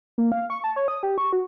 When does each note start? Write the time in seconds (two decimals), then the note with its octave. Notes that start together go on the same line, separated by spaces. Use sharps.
0.18 A#3
0.32 F5
0.50 C#6
0.64 A5
0.76 C#5
0.88 D#6
1.03 G4
1.18 C#6
1.33 F#4